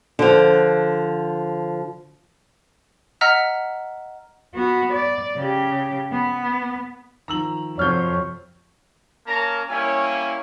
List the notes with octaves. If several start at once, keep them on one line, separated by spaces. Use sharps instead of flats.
D3 F3
D#5 F#5 A#5 E6 F6 B6
B3 F#4
D5
C#3 G4
B3
D#3 F3 A#5 E6 F#7
F2 C3 F3 F#4 C#5 F6 G6
A#3 C#4 A#4 A5 A#5
G3 A#3 C#4 E4 C#5 G#5